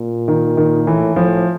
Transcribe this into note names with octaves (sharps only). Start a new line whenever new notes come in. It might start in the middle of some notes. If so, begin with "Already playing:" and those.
Already playing: A#2
D#3
D#3
A2 E3
A2 F3